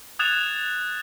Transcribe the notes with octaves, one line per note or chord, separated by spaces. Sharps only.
D#6 F#6 G#6 A6 E7 F7